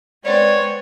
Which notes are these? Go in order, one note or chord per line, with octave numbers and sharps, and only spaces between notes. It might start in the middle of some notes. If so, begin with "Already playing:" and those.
G#3 B3 C4 C#5 D5